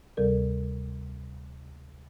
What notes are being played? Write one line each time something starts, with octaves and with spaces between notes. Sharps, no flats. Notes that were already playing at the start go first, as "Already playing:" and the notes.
D2 C3 G3 A4 A#4 D5